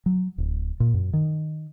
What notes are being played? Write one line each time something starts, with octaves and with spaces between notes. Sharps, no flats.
F#3
D1
A#2
F#2
D#3